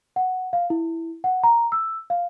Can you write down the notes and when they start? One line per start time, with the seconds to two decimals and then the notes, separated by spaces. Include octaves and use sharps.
0.16 F#5
0.53 F5
0.70 E4
1.24 F#5
1.43 A#5
1.72 E6
2.10 F5